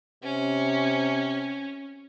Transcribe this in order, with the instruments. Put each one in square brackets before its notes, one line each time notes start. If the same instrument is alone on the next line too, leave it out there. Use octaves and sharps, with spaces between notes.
[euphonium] C3 [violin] C#4